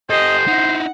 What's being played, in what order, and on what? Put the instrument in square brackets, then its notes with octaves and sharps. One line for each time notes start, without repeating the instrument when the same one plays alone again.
[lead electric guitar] G4 A4 [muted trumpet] C5 [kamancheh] D#5
[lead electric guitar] D#4 E4 [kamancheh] F#5